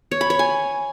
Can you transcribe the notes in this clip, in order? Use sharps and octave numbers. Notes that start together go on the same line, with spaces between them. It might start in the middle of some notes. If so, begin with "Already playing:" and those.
C#5
B5
C#5
G#5